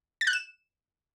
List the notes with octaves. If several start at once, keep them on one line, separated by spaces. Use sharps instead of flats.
A6
F#6
E7